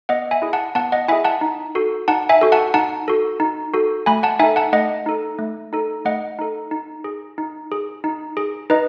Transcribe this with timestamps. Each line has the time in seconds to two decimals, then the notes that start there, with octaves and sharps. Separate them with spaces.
0.09 B3 D#5 F#5
0.31 E5 G#5
0.42 E4 G#4
0.53 F#5 A5
0.75 B3 F#5 A5
0.92 D#5 F#5
1.08 E4 G#4 E5 G#5
1.24 F#5 A5
1.41 D#4
1.75 F#4 A4
2.08 D#4 F#5 A5
2.29 E5 G#5
2.41 F#4 A4
2.52 F#5 A5
2.74 D#4 F#5 A5
3.08 F#4 A4
3.40 D#4
3.74 F#4 A4
4.06 A3 G#5 B5
4.23 F#5 A5
4.39 D#4 A4 E5 G#5
4.56 F#5 A5
4.73 A3 D#5 F#5
5.06 D#4 A4
5.39 A3
5.73 D#4 A4
6.05 A3 D#5 F#5
6.39 D#4 A4
6.71 D#4
7.04 G#4
7.38 D#4
7.72 G#4
8.04 D#4
8.37 G#4
8.70 D#4 B4 D#5